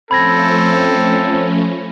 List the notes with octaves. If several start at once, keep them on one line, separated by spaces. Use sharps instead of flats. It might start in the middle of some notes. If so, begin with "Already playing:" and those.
F3 A3 C4 C#4 A4 B5 G#6 A#6